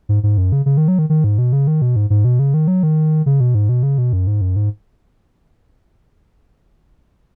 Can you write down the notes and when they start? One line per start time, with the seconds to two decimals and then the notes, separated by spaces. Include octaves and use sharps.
0.09 G#2
0.23 G#2
0.38 F#2
0.52 C#3
0.66 C#3
0.77 D#3
0.88 F#3
0.99 D#3
1.10 D#3
1.24 G#2
1.38 B2
1.53 C#3
1.67 D#3
1.82 B2
1.96 G#2
2.10 G#2
2.25 B2
2.39 C#3
2.54 D#3
2.68 F#3
2.83 D#3
3.26 C#3
3.40 B2
3.55 G#2
3.69 B2
3.83 C#3
3.98 B2
4.13 F#2
4.27 G#2
4.41 F#2
4.56 G#2